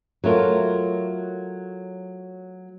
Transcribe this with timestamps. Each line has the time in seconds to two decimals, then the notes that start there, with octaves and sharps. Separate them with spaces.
0.24 F#3 A3 F4 A#4